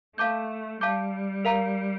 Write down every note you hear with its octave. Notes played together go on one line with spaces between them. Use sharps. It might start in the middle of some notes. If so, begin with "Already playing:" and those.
A3 F5 A5 D6 G6
G3 F5 A5 D6 G6
A#4 F5 A#5